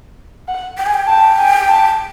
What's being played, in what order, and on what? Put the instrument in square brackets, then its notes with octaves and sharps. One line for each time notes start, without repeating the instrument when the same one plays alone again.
[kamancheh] F#5
[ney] G5
G#5
G5
[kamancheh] A5
G#5
A5